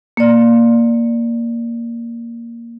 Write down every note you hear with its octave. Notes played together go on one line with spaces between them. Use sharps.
A#3 D5